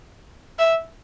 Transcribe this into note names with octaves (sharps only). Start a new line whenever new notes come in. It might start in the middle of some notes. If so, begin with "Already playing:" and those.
E5